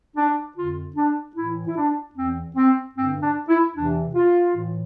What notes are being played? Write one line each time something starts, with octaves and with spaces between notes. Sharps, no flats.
D4
F2 D3 F4
D4
A2 E3 E4
E4
D4
E2 E3 C4
C4
G2 D3 C4
D4
E4
E2 C3 E3 D4
F4
A2 E3